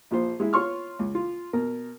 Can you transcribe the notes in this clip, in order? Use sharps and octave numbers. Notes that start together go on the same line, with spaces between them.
A#1 F3 C5
G#3 E4
F4 C#5 C6 C#6 F6
C#2
F4
B2 A#4